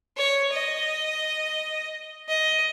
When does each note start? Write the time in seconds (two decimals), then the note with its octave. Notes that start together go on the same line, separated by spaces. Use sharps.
0.17 C#5
0.52 D#5
2.28 D#5